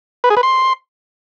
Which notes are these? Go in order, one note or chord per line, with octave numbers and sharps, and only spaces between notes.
B4
G#4
B4
C6